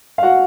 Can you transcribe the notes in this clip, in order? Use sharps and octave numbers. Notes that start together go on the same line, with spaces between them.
F5
F#4 F#5